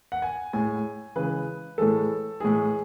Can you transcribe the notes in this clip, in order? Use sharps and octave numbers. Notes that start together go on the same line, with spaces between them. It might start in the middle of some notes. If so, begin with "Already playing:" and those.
F#5
G#5
A2 G#3 G#5
C#3 E3 G#3 B4
A2 E3 G#3 A4
A2 E3 G#3 G#4